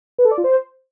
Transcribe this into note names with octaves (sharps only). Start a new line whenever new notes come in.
B4
A4
D5
F4
C5